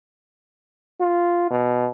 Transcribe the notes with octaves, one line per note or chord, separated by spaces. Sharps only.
F4
B2